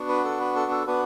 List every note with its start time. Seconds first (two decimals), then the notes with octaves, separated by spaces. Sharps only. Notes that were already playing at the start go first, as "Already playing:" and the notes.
Already playing: B3 D4 F#4
0.09 B4
0.24 A4
0.40 B4
0.56 A4
0.71 A4
0.87 B3 D4 F#4 B4